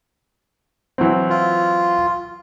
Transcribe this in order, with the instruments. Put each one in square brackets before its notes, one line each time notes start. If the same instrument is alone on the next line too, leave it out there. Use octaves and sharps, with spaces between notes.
[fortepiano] E3 F#3 C4
[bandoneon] F4